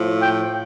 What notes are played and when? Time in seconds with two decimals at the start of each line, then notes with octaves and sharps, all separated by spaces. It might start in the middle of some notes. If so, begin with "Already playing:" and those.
Already playing: A2 F3
0.20 G5